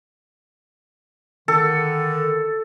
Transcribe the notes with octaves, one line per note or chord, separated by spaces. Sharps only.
D3 D#3 A4